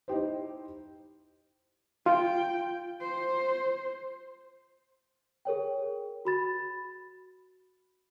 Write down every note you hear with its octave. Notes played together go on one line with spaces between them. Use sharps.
D#4 E4 G4 C5
F4 G5
C5
G#4 A#4 C#5 G5
F#4 B5 A6